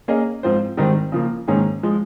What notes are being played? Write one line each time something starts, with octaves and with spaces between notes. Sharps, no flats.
A#3 C#4 G#4 D#5
G#2 F3 C4 F4 C5
G#2 D#3 G3 C4 D#4
C#3 F3 A#3
G#2 D#3 A#3 C#4 G#4
F3 G#3